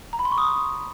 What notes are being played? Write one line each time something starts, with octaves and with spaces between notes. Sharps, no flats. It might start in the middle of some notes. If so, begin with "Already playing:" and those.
A#5
B5
C6
C#6
D#6